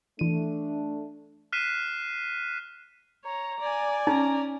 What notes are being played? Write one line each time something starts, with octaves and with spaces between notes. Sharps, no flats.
E3 A3 D4 D#7
F6 F#6 B6 C7 D#7 E7
C#5 A#5
D5 G#5
C#4 D#4 A#5